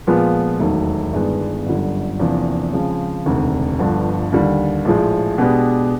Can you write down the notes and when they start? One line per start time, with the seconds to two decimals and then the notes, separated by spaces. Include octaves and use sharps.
0.07 A#2 F3 G#3 B3
0.60 E1 D#2 D#3 F#3 A3
1.13 G1 G2 D#3 G#3 B3
1.66 G1 F#2 D3 G3
2.20 E2 C3 F3 A#3 D4
2.73 C#3 F3 G#3 C4
3.26 E1 D2 C3 D#3
3.79 G1 G2 D3 F3
4.32 D#2 D3 G3
4.85 A#1 A2 F3 G#3
5.38 B2 G#3 B3 D4 G4